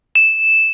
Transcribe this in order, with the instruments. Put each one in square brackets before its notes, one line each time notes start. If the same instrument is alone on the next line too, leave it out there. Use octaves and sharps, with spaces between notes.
[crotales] E7